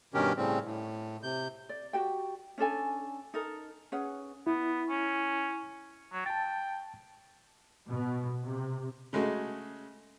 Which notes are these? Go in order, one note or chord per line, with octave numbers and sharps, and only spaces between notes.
G2 B2 D#3 C#4 G4 A#4
A2 C#3 G3 C4
A2
C3 G6
D5
F#4 G4 G5
C#4 D4 A4 G#5
D#4 A4 A#4
C#4 G#4 B4 F#5
B3 E4
C#4
F#3
G5 A5 A6
B2
C3
C#3 G#3 A3 F#4